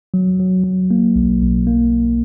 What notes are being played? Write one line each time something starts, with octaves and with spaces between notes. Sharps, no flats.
F#3
F#3
F#3
A#3
B1
B1
A#3